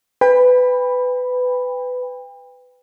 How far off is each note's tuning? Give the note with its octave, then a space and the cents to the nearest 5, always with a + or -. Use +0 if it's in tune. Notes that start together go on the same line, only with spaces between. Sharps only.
B4 +20 G5 +35 B5 +0